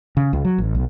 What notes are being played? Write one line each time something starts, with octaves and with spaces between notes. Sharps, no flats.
C#3
C#2
F#3
A1
B1